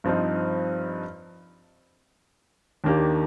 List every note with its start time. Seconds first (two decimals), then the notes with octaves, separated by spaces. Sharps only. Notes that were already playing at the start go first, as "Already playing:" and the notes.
0.04 G2 F3 C4 D#4
2.84 D#2 D#3 A#3 D4 G4